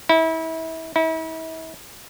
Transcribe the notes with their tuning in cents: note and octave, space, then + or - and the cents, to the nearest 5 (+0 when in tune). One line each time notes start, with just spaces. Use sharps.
E4 -30
E4 -40